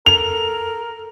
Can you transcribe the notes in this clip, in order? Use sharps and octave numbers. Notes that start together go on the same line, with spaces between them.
A4 A#4 F7